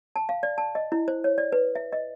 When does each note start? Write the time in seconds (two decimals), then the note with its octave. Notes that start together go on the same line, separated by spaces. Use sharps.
0.16 A5
0.29 F5
0.43 D5
0.58 A5
0.75 D#5
0.92 E4
1.08 C5
1.24 C#5
1.38 D5
1.52 B4
1.75 E5
1.93 D#5